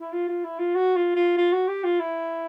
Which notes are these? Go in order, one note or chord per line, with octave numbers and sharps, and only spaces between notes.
E4
F4
F4
E4
F4
F#4
F4
F4
F4
F#4
G4
F4
E4